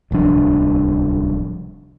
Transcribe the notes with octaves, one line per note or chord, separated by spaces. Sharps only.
D1 C2 F3 D4